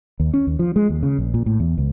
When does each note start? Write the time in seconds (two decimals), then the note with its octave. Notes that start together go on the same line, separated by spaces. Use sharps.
0.20 D#2
0.34 C#4
0.47 D#2
0.59 F3
0.76 G#3
0.89 D#2
1.03 C#3
1.18 A#1
1.34 A#2
1.46 A2
1.60 E2
1.78 C#2